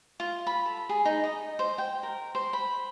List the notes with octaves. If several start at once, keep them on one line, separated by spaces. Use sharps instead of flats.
F4
B5
A4
G#4
D#4
D#5
C5
G5
A#4
C5
B5